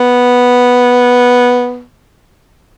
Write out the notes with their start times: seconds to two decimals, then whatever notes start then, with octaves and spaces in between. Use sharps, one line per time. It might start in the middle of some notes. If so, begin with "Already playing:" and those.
Already playing: B3